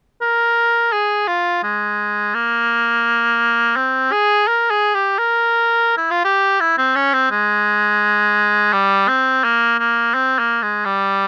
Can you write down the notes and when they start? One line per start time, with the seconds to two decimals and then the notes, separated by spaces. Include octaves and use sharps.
0.21 A#4
0.92 G#4
1.28 F4
1.63 G#3
2.34 A#3
3.76 C4
4.12 G#4
4.47 A#4
4.71 G#4
4.94 G4
5.18 A#4
5.97 E4
6.10 F4
6.24 G4
6.60 E4
6.78 C4
6.96 C#4
7.13 C4
7.31 G#3
8.73 G3
9.08 C4
9.44 A#3
9.79 A#3
10.14 C4
10.39 A#3
10.62 G#3
10.85 G3